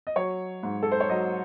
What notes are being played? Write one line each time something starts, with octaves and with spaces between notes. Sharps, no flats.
D#5
F#3 C#5
G#2
A4
C5
C#5
F#3 D#5